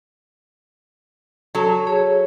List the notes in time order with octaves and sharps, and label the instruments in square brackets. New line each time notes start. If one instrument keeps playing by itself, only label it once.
[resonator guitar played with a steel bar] F#3 A4
[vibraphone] G#4 C#5